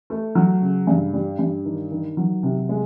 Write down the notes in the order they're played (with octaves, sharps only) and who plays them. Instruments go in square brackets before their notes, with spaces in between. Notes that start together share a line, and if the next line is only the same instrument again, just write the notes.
[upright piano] A3
F#3
C#3
G2
G3
G2
D#3
D#3
F#3
C3
G#3